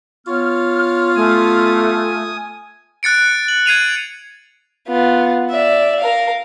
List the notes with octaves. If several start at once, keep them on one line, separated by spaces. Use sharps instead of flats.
B3 F4 C#5 F6
A3 G#5 D#6
F#6 A6 C#7 D7
F#7
G#6 C7 D#7 F7
B3 F4
D5 E5
A#4 F5